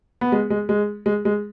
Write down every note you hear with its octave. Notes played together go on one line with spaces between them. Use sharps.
B3
G#3
G#3
G#3
G#3
G#3